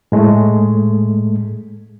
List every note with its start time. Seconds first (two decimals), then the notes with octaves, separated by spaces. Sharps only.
0.12 A2 G#3 A3